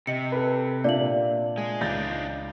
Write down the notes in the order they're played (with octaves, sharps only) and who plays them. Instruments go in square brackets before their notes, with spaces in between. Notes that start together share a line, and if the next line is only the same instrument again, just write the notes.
[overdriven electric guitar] C3 [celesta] D#5 C#7
[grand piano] A4 B4
[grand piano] A#2 D4 E5 [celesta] D5 F5 F#7
[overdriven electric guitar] G#3
[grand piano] C#2 G6 A6 [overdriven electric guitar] D4 D#4